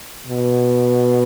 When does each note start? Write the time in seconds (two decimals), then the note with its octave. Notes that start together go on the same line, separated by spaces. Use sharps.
0.28 B2